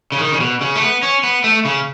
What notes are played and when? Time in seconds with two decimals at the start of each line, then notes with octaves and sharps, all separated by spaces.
0.12 C#3
0.19 D#3
0.33 C#3
0.40 B2
0.61 C#3
0.75 A3
0.82 B3
1.02 C#4
1.23 B3
1.44 A3
1.65 C#3